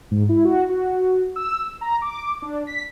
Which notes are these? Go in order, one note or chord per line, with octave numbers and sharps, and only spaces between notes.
G#2
E4
F#4
F#4
E6
A#5
D6
D4
B6